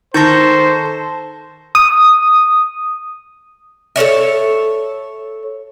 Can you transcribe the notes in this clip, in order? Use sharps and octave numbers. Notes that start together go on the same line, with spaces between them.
D#3 D#4 A4 C5 C#6 G6 A#6
D#6
A4 A#4 C#5 E5